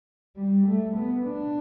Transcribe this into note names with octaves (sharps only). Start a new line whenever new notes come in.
G3
A3
B3
D4